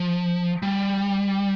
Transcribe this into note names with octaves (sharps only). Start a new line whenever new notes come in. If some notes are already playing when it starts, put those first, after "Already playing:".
Already playing: F3
G3